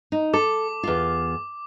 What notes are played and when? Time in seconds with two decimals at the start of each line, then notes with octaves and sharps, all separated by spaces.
0.12 D#4
0.34 A4 D6
0.83 E2 F4